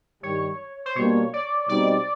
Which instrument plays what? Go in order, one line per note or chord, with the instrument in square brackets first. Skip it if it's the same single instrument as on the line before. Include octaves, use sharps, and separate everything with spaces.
[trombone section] G2 D#3 G3 [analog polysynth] C#5
[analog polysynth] C5
[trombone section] B2 G3 A#3 D4 [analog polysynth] C#5
[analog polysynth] D5
[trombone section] B2 G3 C4 D#4 [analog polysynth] D5